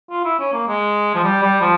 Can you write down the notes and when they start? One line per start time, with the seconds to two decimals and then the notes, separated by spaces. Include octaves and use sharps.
0.10 F4
0.25 E4
0.39 C#4
0.53 A#3
0.68 G#3
1.15 F3
1.24 G3
1.42 G3
1.61 F3